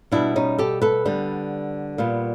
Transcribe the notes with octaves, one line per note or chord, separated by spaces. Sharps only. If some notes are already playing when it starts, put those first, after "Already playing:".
B2 G3 B3 D4 E4
C#4 D#4
G4 A4
A4 B4
D3 G3 B3
A#2 G3 B3